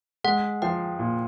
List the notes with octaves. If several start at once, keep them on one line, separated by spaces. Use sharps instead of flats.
G#3 F#5
F3 G5
A#2